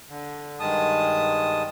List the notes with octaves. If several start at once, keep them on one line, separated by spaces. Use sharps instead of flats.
D3
G2 D#3 G#3 A5 D#6